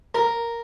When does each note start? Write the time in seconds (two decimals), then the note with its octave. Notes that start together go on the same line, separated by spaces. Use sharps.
0.15 A#4